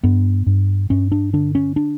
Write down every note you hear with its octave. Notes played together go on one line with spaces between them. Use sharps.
G2 B3
G2
G2 C#4
D4
D3 D4
C#4
D4